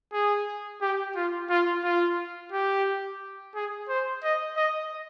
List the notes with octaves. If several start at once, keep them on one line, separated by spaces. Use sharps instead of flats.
G#4
G4
F4
F4
F4
G4
G#4
C5
D#5
D#5